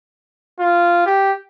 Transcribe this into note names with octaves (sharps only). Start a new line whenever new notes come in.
F4
G4